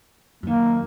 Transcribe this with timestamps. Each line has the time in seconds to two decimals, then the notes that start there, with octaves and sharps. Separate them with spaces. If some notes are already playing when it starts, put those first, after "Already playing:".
0.43 F#2 D#3 A#3